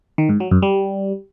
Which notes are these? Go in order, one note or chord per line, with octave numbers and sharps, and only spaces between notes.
D#3
G#2
F#3
F#2
G3